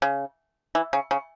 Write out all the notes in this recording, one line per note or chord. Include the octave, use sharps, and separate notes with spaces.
C#3
E3
C#3
C#3